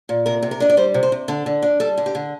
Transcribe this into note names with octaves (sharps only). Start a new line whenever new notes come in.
A#2
C3 A#4
C3
A#4
D4 D#5
D5
G3 C5
C3
C5
C3
D3 A4
D3
D4
G3 A4
D3
G4
D3